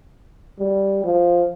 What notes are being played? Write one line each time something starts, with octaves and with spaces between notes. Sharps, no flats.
G3
F3